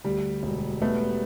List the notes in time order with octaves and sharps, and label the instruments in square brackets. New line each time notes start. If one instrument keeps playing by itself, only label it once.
[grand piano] D2 [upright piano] G3
[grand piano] E1
[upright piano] A3 [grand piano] B3